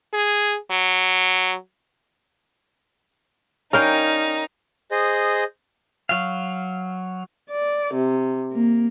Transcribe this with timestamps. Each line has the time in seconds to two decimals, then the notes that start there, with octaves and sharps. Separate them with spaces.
0.14 G#4
0.71 F#3
3.73 G3 C#4 D#4 A#4 F5 G5 A#5
4.91 G#4 C5 D#5
6.09 F#3 F5
7.52 D5
7.94 C3
8.52 A#3